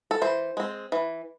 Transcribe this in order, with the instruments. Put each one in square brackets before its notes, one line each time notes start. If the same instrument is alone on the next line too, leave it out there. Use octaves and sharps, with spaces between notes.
[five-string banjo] A4
E3 C5
G#3 C4
E3